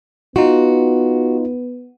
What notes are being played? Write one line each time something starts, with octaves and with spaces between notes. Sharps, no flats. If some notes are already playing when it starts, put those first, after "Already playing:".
B3 D#4 F4 F#4